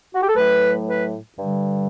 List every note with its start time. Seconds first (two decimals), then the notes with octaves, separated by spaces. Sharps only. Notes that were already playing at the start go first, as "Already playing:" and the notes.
0.14 F#4
0.22 G4
0.28 A4
0.36 A2 F#3 A3 B4
0.87 B4
1.38 G2 D3 G3